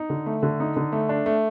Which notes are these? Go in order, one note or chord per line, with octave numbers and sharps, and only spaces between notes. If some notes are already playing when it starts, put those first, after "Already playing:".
Already playing: D#4
D3
A3
D3
D#4
D3
A3
D4
A3